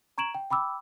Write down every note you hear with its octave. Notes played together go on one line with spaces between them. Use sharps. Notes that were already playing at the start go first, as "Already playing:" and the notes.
A#5 C#6 G#6 D7 E7 F#7
G5
G5 B5 D6 E6